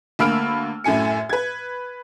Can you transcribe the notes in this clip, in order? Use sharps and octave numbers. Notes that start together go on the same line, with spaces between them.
D2 A#3 B5 E6 F6 D7
F#2 A2 G#5 C#7
B4 G#6